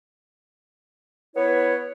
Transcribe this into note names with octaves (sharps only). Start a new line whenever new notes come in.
B3 E4 B4 C#5